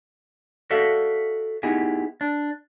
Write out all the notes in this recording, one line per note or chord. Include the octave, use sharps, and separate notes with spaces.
F#4 A4 D5 E5 F5
B3 D#4 E4 G4 G#4
D4